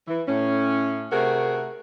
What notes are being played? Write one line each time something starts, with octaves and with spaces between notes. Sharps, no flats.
E3
A2 C#4
C3 A3 F#4 G#4 A#4